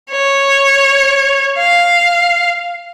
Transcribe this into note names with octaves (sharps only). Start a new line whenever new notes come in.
C#5
F5